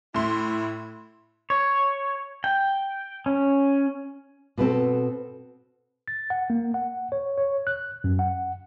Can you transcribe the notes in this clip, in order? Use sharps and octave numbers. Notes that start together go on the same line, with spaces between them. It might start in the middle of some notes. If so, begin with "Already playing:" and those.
A2 E4 C6
C#5
G5
C#4
B2 B3 C4 A4
A6
F#5
A#3
F#5
C#5
C#5
F#6
F#2
F#5